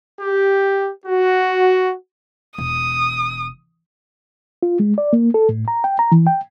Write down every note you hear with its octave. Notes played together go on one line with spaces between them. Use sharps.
G4
F#4
E1 D#6
F4
G#3
D5
A#3
A4
A2
A#5
G5
A#5
E3
G5